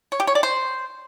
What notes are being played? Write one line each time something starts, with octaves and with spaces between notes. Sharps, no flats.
C#5
G4
C#5
D5
C5